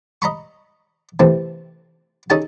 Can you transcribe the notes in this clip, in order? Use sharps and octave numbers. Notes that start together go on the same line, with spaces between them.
D#5 A#5 B5 C#6
C3 E3 A3 C4
C#4 D#4 G#4 A4 G#5 A5